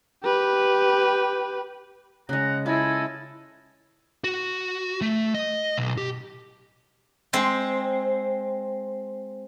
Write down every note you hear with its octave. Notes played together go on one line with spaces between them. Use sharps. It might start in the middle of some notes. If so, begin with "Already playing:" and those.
G4 B4
C#3 G#3 F#5 A#5
E4 F4 A4 D#5 G#5
F#4
A3
D#5
B1
G4
G#3 C4